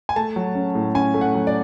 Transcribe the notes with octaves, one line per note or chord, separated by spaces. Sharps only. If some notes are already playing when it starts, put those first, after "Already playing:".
G#5
A3 A5
F#3
C#4
A2
C#4 G#5
A3
F#5
F#3
D5